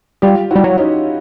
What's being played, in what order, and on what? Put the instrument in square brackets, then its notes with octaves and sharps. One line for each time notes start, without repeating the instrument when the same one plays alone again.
[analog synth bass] G3 [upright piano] F4 G4
[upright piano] E4 F#4
[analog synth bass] G3
F#3
[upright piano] C#4 D#4